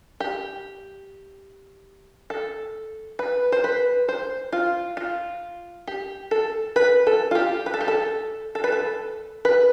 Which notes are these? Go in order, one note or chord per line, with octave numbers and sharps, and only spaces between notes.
G4
A4
B4
C5
B4
C5
F4
F4
G4
A4
B4
A4
F4
G4
B4
A4
G4
A4
A4
B4
A4
B4